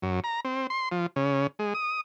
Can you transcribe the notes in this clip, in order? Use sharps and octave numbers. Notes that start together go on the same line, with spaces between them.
F#2
A#5
C4
C6
F3
C#3
G#3
D#6